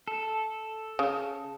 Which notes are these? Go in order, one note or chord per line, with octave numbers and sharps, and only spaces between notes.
A4
C#3